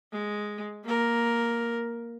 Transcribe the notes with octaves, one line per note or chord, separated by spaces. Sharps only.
G#3
A#3 A#4